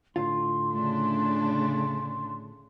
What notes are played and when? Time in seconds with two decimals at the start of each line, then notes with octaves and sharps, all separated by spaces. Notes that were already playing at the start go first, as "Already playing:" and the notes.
0.16 A2 D3 F4 C6
0.72 C#3 A3 D4